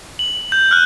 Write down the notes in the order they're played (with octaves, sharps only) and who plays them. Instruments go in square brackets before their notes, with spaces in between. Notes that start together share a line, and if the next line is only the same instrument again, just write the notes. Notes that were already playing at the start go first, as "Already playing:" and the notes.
[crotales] F#7
G6
F6 F#6